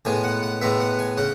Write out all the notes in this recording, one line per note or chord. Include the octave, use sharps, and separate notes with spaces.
A2 G#3 B3 G#5
F#5
F#5
A2 G#3 B3 E5
F#5
G#5
C#3 F#5